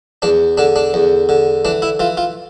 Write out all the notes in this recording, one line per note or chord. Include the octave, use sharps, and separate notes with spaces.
E2 D4
D3 D4
D4
E2
D3
E3 D4
E4
E3 F4
F4